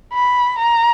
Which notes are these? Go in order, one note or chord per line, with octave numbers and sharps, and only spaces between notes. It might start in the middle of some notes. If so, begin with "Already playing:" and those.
B5
A#5